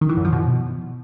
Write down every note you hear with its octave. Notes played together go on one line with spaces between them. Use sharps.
D#3
E3
F#2
F3
B2